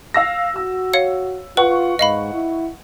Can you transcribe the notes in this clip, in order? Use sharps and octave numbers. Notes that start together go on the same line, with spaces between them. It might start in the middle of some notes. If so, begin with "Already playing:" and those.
F5 E6 A#6
F#4 E6
C#5 F5 C#7
F4 B4 F#5 C#6
G#2 D#5 F5 B5
E4